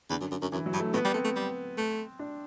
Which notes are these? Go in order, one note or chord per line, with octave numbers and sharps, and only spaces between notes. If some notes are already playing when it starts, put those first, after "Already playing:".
E2 D3
F#2
F#2
F#2
F#2 E3
F#3
G2
A3
A2 B3
G3
A3 C4
A3
G3
A3
D4